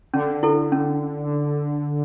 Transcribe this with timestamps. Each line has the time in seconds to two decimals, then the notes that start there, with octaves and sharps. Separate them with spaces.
0.14 D3 C#4
0.43 E4 A4
0.72 C#4